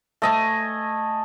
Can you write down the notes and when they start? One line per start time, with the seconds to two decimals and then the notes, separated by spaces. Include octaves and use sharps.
0.22 A3 D#5 G#5